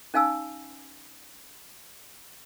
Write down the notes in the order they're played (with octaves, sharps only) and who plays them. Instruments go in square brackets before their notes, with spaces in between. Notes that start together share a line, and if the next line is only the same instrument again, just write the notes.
[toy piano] C#4 D#4 F5 G#5 E6